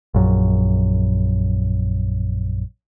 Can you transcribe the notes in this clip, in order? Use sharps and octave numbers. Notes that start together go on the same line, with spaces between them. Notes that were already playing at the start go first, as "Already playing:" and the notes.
A#1 F#2